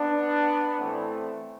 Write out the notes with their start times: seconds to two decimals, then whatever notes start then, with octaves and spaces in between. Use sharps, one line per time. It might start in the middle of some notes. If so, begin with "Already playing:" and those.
Already playing: B3 D4
0.78 A2 E3 A3 C4